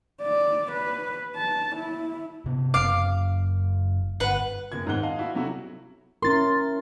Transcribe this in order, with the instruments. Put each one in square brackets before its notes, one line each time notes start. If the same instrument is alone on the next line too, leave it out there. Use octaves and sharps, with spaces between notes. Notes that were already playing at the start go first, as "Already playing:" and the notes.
[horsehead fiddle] D5
B4
A5
E4
[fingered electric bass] C3 B3
[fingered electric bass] F#1 [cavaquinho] F5 D6
[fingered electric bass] G1 [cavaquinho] B4 F#5
[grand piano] F#1 G#6
D#2 G#2 C4 F#5 F#6 G7
D#5 F5 A5
E4 F#4 F5
C3 F#3 C#4 E4 F#4 A4
[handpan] C#4 E4 A#4 [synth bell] C6 A6